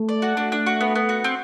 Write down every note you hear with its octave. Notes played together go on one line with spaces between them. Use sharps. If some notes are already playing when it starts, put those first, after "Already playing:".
Already playing: A3
D5
F#4
A3 D4
D4
F#4
B3
B3
F#4
C4